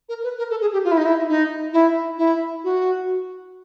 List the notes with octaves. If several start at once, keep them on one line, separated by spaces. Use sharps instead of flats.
A#4
B4
A#4
A4
G#4
G4
F4
E4
D#4
E4
D#4
E4
E4
F#4